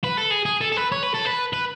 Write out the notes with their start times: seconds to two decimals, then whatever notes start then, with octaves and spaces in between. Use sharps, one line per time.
0.04 B4
0.17 A4
0.31 G#4
0.46 G#4
0.61 A4
0.72 A4
0.77 B4
0.92 C#5
1.03 B4
1.14 A4
1.25 B4
1.53 B4